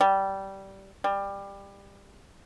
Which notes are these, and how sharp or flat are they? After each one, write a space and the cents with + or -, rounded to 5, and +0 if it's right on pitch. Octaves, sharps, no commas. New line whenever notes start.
G3 -15
G3 +20